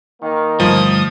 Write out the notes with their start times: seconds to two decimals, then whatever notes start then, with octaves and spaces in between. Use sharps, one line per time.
0.21 D#3 A#3 D#4
0.60 D2 G2 F3 D#6